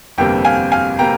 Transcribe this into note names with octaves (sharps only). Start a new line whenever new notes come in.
G1 F2 C3 G3 A#3 G5
F5 G#5
F5 G#5
C3 G3 A#3 G5 A#5